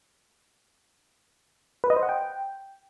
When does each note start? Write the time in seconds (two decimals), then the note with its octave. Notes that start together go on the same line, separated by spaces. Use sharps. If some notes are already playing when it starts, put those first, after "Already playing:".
1.84 B4
1.90 D#5
1.96 C5
2.03 F#5
2.09 G5